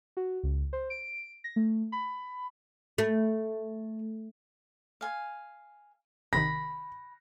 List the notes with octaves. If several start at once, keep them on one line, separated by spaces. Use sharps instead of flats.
F#4
C#2
C5
D7
A#6
A3
B5
A3
F5 G#5
A#1 C3 D#3 B5 A#6